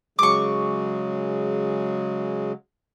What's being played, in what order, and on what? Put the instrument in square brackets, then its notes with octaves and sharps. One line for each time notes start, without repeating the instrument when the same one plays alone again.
[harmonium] C#3 F#3 G#3 [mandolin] C#6 D6